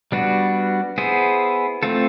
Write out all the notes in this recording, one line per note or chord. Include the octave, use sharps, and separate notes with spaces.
G3 B3 D4 F#4
B3 E4 G#4 C5
A3 C4 F4 A4